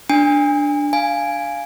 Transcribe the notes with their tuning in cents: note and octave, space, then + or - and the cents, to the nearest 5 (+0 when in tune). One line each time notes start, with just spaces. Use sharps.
D4 +0 G#5 -35
F5 +0 G#5 +0